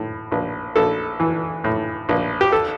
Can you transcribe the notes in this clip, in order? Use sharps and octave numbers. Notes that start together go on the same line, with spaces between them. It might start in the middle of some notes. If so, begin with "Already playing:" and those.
Already playing: A2
A#1
A#1 A4
E3
A2
A#1
G4
A4